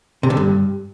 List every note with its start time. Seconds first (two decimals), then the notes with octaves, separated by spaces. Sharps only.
0.23 C3
0.30 D3
0.37 G2